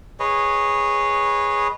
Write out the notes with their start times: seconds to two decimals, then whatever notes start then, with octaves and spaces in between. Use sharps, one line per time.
0.20 G#4 B4 C#5 D#5